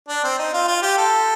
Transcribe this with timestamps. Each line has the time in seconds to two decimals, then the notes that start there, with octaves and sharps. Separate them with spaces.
0.08 D4
0.24 C4
0.38 D#4
0.53 F4
0.68 F4
0.82 G4
0.97 A4